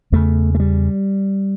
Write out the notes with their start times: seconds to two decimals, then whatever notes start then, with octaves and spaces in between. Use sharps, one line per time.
0.12 E2 C#3 A3
0.55 A3
0.60 G3